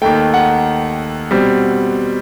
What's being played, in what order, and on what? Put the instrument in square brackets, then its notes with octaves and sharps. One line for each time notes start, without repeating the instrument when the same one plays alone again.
[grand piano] D#2 D#3 A3 G5
F#5
B2 G3 C4